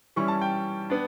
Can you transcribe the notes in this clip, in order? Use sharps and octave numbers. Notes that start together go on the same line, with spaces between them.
E3 G3 C#4 E4 C#6
A5
G5
B3 D4